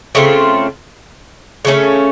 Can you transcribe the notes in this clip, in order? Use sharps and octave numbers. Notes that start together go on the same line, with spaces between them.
C#3 A3 C4 F4
C#3 A3 C#4